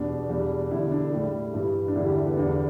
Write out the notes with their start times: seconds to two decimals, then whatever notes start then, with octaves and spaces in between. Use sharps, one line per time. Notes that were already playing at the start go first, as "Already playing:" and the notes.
Already playing: E2 B2 G3 D4
0.29 E2 B2 G3
0.71 E2 D3 G3 E4
0.92 D4
1.13 A2 G3 G4
1.54 G2 E3 G3
1.88 D4
1.95 E2 D3 G3 E4
2.06 G4
2.16 E4
2.26 B3
2.36 E2 D3 G3 D4